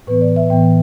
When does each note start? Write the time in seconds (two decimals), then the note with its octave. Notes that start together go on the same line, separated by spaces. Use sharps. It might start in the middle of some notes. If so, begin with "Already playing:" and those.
0.07 A2 E3 B3 B4
0.21 D5
0.36 E5
0.50 A2 E3 B3 G5